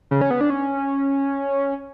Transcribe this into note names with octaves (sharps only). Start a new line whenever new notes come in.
C#3
C#4
B3
D4
C#4